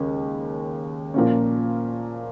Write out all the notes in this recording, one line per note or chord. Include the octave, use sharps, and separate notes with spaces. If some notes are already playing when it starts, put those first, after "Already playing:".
Already playing: D#2 C#3 G#3 C#4
A#2 F3 A#3 C#4